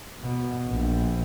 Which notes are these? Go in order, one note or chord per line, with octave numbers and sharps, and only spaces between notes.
B2
A#1